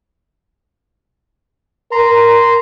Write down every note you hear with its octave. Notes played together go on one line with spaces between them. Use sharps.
A#4 A#5 C6